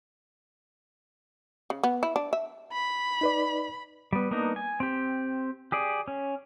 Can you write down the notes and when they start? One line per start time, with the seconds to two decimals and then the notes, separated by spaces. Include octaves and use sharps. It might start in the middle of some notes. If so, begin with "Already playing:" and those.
1.70 C#3
1.84 B3
2.03 E4
2.16 D4
2.33 E5
2.72 B5
3.21 D#4 B4 D5
4.13 G3 B3
4.31 A#3 B3 D4 D#4
4.56 G#5
4.80 C4 G4
5.72 G4 G#4 D5
6.08 C#4